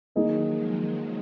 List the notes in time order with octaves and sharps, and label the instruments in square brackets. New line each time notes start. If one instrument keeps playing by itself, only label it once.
[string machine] D#3 F#3 [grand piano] A#3 D#4 G#4 D#5
[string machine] F3 G#3
D#3 F#3